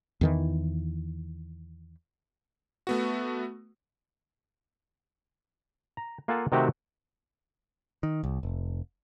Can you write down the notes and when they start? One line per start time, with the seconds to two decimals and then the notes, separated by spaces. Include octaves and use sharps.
0.21 E2 D#3 E3
2.87 A3 B3 F#4
5.97 A#5
6.28 A#3 F4 A4 F#5 G#5 A5
6.52 C3 D#3 A3 C4 F#4 G4
8.03 D#3
8.24 C2
8.43 F1